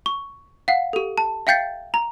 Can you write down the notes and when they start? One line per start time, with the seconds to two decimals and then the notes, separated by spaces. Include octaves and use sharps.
0.06 C#6
0.68 F5 F#5
0.93 G4 A4
1.18 A5
1.47 E5 F5 G5 G6 A6 C7
1.94 A#5